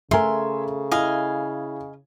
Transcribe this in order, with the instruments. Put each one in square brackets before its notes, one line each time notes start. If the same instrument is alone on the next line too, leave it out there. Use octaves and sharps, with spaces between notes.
[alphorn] C#3 [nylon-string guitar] A3 A#4 [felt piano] E5 G#5 [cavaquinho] C6
[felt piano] E4 [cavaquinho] D#5 F5 G#5